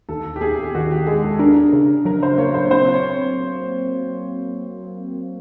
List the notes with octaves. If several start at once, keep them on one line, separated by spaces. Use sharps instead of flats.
D#2 A4
G4
D#2 G#4
G4
D#3 F#4
G4
G#3 G#4
A4
D4 A#4
C#3
F#3 A#4
C5
A#3 C#5
C5
C4 C5
C#5